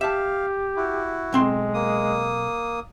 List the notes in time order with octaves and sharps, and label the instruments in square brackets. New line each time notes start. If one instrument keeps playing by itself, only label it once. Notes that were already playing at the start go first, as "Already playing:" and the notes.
[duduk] G4 [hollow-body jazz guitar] E5 A5 [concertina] F5
[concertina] E4 F#4
[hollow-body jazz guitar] B1 C4 C6 [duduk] G#3
[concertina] A#3 D#6